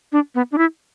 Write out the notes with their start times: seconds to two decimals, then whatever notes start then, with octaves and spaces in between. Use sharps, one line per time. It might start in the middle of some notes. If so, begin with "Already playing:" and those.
0.12 D4
0.35 B3
0.52 D4
0.58 E4